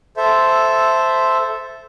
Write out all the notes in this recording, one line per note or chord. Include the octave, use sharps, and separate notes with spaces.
A4 C5 E5